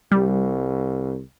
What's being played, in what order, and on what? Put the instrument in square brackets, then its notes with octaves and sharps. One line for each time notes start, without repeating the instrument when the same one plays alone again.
[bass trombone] C2 [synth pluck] G3